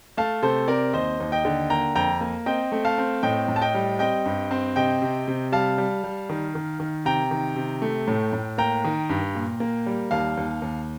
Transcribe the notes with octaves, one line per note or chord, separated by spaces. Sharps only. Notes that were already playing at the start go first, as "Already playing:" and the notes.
A3 F5 A5
C3 A4 C5
C4 A#4 D5
D#2 C5 D#5
D#2
D#5 G5
D3
A#3 G5 A#5
F2 G5 A#5
A#3
C4 D#5 G5
A3
F5 A5
C4
A2 D#5 G5
A2
A5
D#5 G5
G3
C4 D#5 G5
G2
C4
C3 D#5 G5
C3
C3
G3 F5 A5
G3
G3
D#3
D#3
D#3
C3 G5 A#5
D#3
C3
A3
A2
A2
A#3 G5 A#5
D#3
G2
A#2
A#3
G3
D#2 F5 A5
D#2
D#2